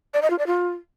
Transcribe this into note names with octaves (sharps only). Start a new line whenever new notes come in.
D5
D#5
F4
D5
F4